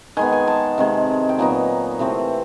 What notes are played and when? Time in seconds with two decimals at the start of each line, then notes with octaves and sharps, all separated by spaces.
0.17 D#3 G#3 B3 G#5
0.32 G#5
0.48 A5
0.78 C3 D#3 G#3
1.29 G5
1.38 A#2 F#3 B3 D#4 G#5
1.99 C3 E3 A3 C4